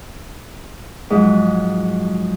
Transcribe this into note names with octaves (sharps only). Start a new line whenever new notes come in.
G#2 F3 F#3